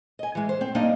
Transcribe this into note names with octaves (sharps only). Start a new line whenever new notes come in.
D#5 G#5
E3 G#3
C5
C4
G3 A#3 D4 D#4 D#5 F5